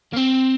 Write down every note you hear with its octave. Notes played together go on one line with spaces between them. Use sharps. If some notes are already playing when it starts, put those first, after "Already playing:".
A#3
C4